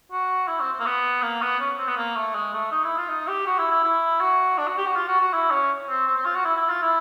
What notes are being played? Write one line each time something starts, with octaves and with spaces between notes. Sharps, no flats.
F#4
E4
C4
C4
A#3
B3
A#3
B3
C#4
C4
B3
A#3
A3
G#3
A3
D#4
E4
F4
D#4
G4
F#4
E4
E4
E4
F#4
D4
F#4
G4
F#4
F4
F#4
F#4
E4
C#4
C4
C4
C4
F4
F#4
E4
E4
F4
E4